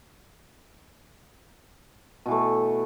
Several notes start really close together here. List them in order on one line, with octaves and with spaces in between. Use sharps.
B2 E3 A3